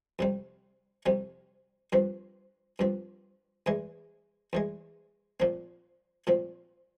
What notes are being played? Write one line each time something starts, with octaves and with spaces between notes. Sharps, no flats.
F2 C3 G3 C4
F2 C3 G3 C4
G2 F3 C4
G2 F3 C4
E2 E3 G#3
E2 E3 G#3
A#2 F3 C4
A#2 F3 C4